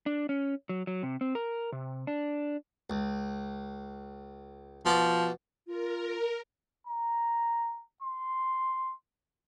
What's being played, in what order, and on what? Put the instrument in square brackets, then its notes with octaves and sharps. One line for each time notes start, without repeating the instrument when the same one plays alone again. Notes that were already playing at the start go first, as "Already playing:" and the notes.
[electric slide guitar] D4
C#4
F#3
F#3
C3
C4
A#4
C3
D4
[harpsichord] C#2
[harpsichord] B2 A5 D6 [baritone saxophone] F3
[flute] F4 [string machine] A#4
[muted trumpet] A#5
C6